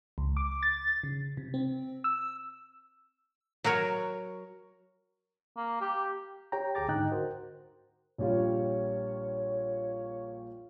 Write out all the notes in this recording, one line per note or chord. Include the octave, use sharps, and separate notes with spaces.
C#2
D6
A6
C#3
C3
C4
E6
F#3 F#4 A#4 C#5
A#3
G4
G4 C#5 G5 A#5
D2 G#4 G5 A#5 D6 A6
G#2 D3 D#4 D#5 G5 F#6
F#4 A#4 C5
A#1 G3 F4 C#5